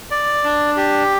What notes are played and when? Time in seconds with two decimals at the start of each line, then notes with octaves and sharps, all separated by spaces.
0.11 D5
0.44 D4
0.77 G4